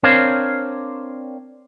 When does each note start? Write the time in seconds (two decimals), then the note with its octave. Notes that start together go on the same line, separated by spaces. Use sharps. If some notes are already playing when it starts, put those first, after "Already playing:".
0.03 C4 D4 A#4 C5 C#5 F5